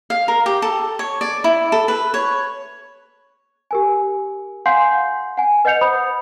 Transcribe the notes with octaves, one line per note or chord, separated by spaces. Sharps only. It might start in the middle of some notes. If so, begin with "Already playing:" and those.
F5
A#4
G4
A4
C#5
D5
E4
A4
B4
C#5
G4 A#4 G#5
F5 F#5 G#5 C6 G6 C7
F#5 G#5
B4 D#5 F#5 G6 C#7 F7
C5 B5 D#6